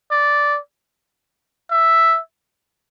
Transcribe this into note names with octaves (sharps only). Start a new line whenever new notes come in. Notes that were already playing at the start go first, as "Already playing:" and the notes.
D5
E5